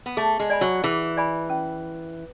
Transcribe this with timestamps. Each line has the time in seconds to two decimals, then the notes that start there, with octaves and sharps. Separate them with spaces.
0.06 B3
0.17 A3 G#4
0.40 G#3
0.50 D5 G#5 B5
0.61 F#3
0.84 E3 G#4
1.17 D5 G#5 B5
1.50 C#4